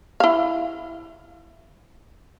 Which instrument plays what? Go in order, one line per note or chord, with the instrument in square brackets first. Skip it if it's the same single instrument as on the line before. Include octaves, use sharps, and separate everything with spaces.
[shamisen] E4 F5